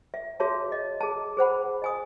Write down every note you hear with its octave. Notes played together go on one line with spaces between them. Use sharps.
E5
F#4 G#4 C#5 E5 F5 A5
D#5
G#4 A5
G#4 C5 F#5 B5
D#5 G#5 D#6